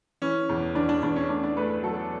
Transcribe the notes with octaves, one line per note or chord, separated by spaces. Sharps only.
E3 C#4
E2
E2 D4
D4
E2 D4
C#4
A3 D4
D4
A3 B4
B4
F#3 A4